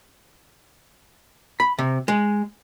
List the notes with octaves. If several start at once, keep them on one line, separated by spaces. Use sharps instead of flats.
B5
C3
G#3